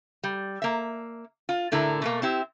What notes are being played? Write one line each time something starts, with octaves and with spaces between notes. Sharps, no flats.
G3
A#3 E5
F4
A2 D3 E4 A#4
B2 A3 A#3
C4 E4 G4